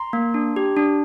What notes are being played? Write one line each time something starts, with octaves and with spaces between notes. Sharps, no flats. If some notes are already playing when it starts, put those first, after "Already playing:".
Already playing: A#5 C6
A#3
D4
G4
D4